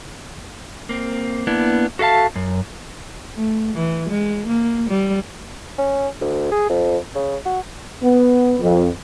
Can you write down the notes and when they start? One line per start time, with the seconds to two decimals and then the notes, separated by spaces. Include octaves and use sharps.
0.89 A#3 C4
1.47 A#3 B3 D4 E4
1.99 F#4 A4 E5 F5 A5
2.36 F#2
3.36 A3
3.75 E3
4.09 G#3
4.46 A#3
4.90 G3
5.78 C#4
6.21 D2
6.51 G#4
6.69 F2
7.15 C#3
7.45 F#4
8.03 B3
8.60 F2